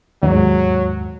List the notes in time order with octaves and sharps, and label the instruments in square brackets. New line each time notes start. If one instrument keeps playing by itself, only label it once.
[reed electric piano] D#2 G#2 [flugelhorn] F#3